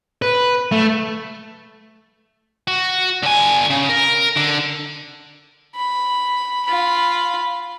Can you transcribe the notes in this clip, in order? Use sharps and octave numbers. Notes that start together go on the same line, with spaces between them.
B4
A3
F#4
D3 G#5
C#3
A#4
D3
B5
F4 B5